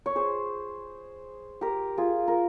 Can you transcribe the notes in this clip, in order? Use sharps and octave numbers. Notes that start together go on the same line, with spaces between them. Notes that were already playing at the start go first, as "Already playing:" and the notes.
C#5
G#4 C5
G4 A#4
F4 G#4
A#4